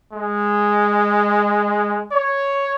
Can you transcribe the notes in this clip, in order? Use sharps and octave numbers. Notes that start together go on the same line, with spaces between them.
G#3
C#5